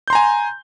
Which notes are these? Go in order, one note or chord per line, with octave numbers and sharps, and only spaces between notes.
G#5 A#5 C6 G6